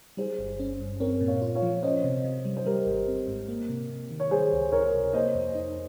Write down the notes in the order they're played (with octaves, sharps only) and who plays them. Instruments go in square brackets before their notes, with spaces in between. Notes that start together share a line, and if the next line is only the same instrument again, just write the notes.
[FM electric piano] G3 [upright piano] G#4 C5
[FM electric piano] G1
C#4
G2
[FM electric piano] C4 [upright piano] A#4 C#5
[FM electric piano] A#2
[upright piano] C#5 F5
[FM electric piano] F4
[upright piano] C#5 F5
[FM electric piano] F3
[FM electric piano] C#4 [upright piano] C5 D#5
[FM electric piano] C3
C3
G3
[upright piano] C5
[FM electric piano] G3 [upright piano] G4 A#4
[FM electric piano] G#1
C4
G#2
A#3
C3
C3
D#3
[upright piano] C#5
[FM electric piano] G3 [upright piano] G#4 C5
[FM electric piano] C#2
[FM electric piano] C#2 [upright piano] A#4 C#5
[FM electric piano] C3
[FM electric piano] A#3 [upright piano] C5 D#5
[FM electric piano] F2
D#4